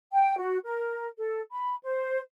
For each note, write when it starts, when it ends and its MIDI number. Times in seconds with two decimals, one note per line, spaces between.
0.12 0.38 79
0.39 0.58 66
0.66 1.07 70
1.18 1.40 69
1.52 1.75 83
1.83 2.20 72